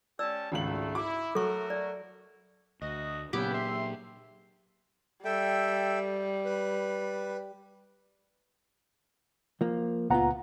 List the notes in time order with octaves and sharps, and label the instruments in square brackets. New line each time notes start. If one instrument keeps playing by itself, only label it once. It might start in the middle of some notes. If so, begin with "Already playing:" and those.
[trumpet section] C#4 G4 A5 [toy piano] D5 E6
[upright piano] G#1 C#2 F#7 [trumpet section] A3
[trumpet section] E4 [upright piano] D6
[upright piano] F#3 [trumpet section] A3 F#4 A#4 [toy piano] A4 C#6
[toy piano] D5
[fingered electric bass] D2 [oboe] F#4 [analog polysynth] D#5
[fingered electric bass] A#2 F#3 [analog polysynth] C#3 B3 F#5 [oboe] E4 [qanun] G4
[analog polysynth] E5 [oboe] C6
[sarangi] G3 [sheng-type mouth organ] A4 E5 G5
[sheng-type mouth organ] B4
[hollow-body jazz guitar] F3 A#3
[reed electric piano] C#2 F#5 A#5 [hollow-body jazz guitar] A#2 B3 F4